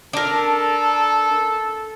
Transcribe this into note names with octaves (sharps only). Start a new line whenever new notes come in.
D4 A4 A#4